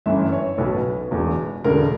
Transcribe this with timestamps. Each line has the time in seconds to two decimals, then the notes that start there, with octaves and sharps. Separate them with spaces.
0.06 G1 F#2 E3 E5
0.32 C#5
0.58 B1 B2 B4
1.11 E1 E2 B2
1.64 E1 D2 D3 A#4